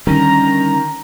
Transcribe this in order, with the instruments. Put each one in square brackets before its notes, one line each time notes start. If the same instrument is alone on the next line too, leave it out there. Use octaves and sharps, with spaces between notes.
[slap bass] D3 G3 [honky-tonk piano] D#3 [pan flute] C#4 [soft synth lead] A#5